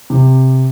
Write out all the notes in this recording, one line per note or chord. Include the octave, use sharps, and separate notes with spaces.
C3